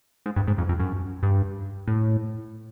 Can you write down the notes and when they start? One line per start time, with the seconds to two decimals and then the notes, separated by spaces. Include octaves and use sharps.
0.26 G#2
0.36 G2
0.48 G#2
0.58 F2
0.69 F2
0.80 F#2
1.23 G2
1.88 A2